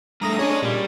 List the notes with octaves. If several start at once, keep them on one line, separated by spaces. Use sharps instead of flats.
G2 A3 A#5 D#6 A#6
C#4 D4 G#4 C#5 D#5
A#2 G3